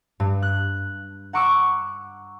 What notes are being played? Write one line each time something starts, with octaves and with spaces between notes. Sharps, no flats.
G2
F#6
F#5 A#5 C#6 D6 E6